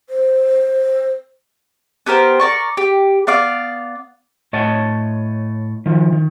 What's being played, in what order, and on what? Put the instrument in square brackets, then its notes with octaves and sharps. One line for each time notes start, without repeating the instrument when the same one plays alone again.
[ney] C5
[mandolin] B3 G4 A#4 C5
A#4 D5 C#6
G4
B3 D5 F5 D6
[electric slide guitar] A2 C#5 D#5 F#5 A5
D#3 F3
D#3